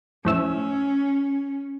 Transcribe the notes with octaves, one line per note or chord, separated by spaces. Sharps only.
F2 A2 C#4 E6